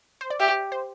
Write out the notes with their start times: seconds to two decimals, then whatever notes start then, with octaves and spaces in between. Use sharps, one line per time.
0.21 C5
0.30 D5
0.40 G4 E5
0.72 C5